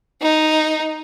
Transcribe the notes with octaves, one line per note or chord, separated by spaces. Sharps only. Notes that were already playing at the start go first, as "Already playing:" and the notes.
D#4